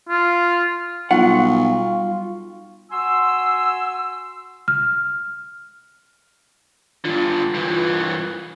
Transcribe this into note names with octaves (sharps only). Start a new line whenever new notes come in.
F4
B1 G3 F4 F#5 C#6
F#4 G#5 C6 E6
F6
G2 D3 F4
G2 E3